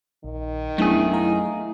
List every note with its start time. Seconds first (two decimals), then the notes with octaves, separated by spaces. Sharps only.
0.24 A#1 D#3
0.78 F#2 A3 B3 D4 E4 G#4
1.13 E4 F5 A#5